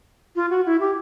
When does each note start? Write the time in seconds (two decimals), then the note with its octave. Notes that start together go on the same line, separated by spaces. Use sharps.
0.36 F4
0.50 F#4
0.66 E4
0.80 G4